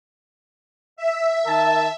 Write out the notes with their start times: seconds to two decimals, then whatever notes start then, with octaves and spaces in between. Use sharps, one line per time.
0.97 E5
1.46 D#3 A#4 A5